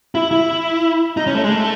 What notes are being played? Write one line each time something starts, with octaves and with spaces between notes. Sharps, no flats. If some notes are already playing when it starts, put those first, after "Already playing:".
E4
E4
D#4
C#4
A3
G#3
A3